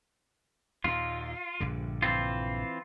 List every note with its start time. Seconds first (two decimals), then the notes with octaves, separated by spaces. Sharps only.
0.84 D#2 A#2 F4
1.60 A#1 G2 D3
2.02 E3 C4 F4